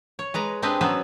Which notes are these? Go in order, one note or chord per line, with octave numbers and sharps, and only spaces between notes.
C#5
G#3 B4 A#5
G#3 C4 D4 G4 B4 D#5
F#3 B3 C#4 B4 C5 E5